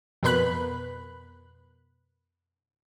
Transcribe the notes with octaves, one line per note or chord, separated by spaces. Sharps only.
F2 B2 A#4 B4 B5 F#6